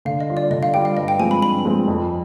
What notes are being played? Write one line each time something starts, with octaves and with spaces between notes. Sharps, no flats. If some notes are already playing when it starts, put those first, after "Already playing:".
D3 F5
D#5
G3 D4 F4
D5
D3 D#5
F5
G3 D4 F4 G5
F5
G2 D#5
G5
F3 G#3 C4 G#5
B5
G2 B5
F3 G#3 C4
F2